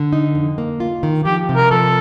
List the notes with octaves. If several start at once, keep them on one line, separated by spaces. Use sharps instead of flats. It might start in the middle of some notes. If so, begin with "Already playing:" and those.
Already playing: D3
D#4
F2
A#3
F4
D#3
F3 G4
C3
A#4
F3 A4